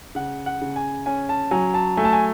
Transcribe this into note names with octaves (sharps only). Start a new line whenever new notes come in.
C#3 F#5
F#5
C#3
G#5
C#4 G#5
A5
F#3 G#5
A5
A3 G#5
A5
G#5